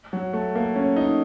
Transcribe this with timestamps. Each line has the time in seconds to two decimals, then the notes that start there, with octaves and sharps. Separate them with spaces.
0.13 F#3
0.33 A3
0.55 A#3
0.76 C#4
0.96 D#4